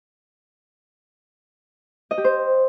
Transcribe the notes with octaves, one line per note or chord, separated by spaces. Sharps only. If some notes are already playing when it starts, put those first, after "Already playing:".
D#5
G4
C5